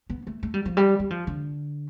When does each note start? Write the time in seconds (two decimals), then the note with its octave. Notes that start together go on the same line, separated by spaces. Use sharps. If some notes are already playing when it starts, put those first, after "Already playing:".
0.10 B3
0.27 A3
0.43 A3
0.54 G3
0.65 F3
0.77 G3
0.99 G3
1.10 F3
1.27 D3